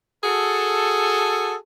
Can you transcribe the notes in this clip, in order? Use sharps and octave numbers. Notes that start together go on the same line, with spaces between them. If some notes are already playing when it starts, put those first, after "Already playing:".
F#4 G#4 A4